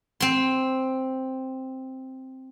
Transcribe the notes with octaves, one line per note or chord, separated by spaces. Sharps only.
C4 C6